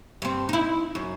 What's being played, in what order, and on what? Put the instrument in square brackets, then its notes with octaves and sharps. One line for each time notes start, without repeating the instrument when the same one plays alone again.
[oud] G2 C4
D#4 E4
F#2